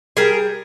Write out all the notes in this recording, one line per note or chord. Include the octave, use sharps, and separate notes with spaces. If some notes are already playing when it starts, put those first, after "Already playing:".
G3 G#4 A#4